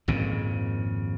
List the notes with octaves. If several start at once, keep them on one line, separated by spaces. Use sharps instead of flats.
G#1 F2 A#2 C#3